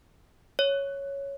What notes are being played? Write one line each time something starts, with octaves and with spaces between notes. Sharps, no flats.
C#5